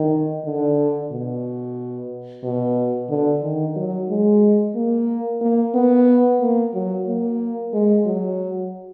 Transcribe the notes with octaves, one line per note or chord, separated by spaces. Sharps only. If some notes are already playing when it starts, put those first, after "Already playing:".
Already playing: D#3
D3
B2
B2
D3
D#3
F#3
G#3
A#3
A#3
B3
A#3
F#3
A#3
G#3
F#3